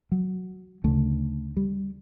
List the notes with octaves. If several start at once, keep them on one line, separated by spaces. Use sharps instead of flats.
F#3
D2 C#3 A3
G3